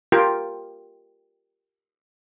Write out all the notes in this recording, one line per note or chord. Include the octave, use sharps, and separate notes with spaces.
F4 G4 A#4 G5